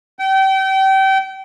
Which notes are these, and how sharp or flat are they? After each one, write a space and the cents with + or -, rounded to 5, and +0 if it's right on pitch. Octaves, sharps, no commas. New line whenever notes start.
G5 -30